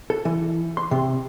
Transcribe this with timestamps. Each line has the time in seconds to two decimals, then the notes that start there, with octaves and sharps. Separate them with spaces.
0.10 A4
0.25 E3
0.77 C6
0.91 C3